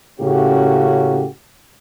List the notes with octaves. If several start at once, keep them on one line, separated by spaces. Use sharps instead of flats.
A2 C#3 A#3 C#4 F#4 G4